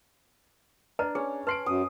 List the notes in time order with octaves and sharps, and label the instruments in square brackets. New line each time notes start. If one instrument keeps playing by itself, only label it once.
[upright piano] D4 [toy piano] B4 D#5 A#5
[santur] C#4 [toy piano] G#4
[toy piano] B4 C6 [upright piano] A5 C7 D7
[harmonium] F#2 [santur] D#6